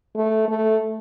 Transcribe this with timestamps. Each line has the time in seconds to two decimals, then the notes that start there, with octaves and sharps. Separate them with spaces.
0.16 A3
0.48 A3